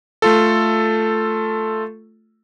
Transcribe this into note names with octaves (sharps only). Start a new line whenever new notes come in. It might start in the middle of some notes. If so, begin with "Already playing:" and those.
A3 F4 A4